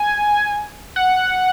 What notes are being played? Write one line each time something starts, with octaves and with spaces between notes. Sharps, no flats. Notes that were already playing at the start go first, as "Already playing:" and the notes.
Already playing: G#5
F#5